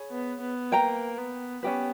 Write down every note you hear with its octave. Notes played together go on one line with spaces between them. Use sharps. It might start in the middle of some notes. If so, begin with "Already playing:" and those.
Already playing: G#4 C#5 B5
B3
B3
A#3 B4 G5 A#5
B3
B3 C#4 G4 B4